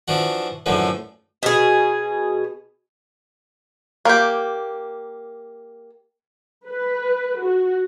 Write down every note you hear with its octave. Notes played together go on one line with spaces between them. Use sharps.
E3 F3 D4 F#4
F#2 A2 D3 E3 F3
B2 G#4
A#3 G4
B4
F#4